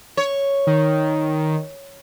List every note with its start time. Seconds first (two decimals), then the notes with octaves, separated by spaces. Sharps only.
0.17 C#5
0.67 D#3